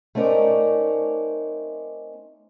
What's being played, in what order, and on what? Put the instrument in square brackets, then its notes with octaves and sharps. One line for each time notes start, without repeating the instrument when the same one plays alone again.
[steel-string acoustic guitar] A3 C4 C#4 D#4 A#4 D5